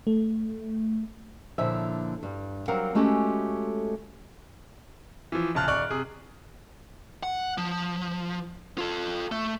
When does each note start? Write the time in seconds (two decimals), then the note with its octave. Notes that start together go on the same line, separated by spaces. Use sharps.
0.07 A3
1.58 A#2 D3 F3 E4 C#5 E5
2.23 G2 G3
2.68 F#3 G3 C4 A#4 F5 F#5
2.95 G#3 A3 C#4 F#4 G4 A4
5.32 E3 F3
5.55 A#1 C#3 A5 F6 F#6
5.68 D1 D5 C#6 F#6 F#7
5.90 C3 G#4
7.23 F#5
7.58 F3
8.78 F4 A4
9.32 A3